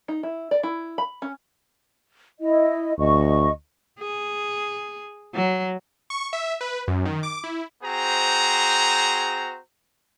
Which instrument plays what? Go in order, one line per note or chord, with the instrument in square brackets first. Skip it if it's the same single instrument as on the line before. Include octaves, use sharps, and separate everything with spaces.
[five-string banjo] D#4
E4
D5
E4
B5
C#4
[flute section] E4 D#5
[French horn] D2 [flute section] D#5 C#6
[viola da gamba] G#4
F#3
[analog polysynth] C#6
E5
B4
F#2
D#3
D6
E4
[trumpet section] C4 F#4 G#4 C5 A#5